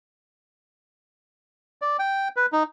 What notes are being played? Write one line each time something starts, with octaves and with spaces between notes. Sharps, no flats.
D5
G5
B4
D#4